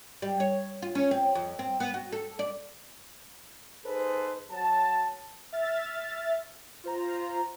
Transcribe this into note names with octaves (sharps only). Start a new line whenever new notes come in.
G3
C#5
F4
C#4
C4
F2
C4
B3
F#4
A4
D5
D#4 G#4 A4 B4 C5
F#3 A5
E5 F6 A6
F4 C5 A#5